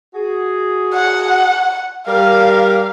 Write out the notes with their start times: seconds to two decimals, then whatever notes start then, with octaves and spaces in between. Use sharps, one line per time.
0.15 F#4 G#4
0.93 F#5
2.07 G3 A#4 F5